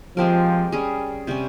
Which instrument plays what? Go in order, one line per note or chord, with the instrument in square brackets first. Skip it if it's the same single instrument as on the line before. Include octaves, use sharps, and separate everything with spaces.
[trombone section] F3 [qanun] G#3 C4 G4 A#4
[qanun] G3 C#4 G#4
C3 G3 C#4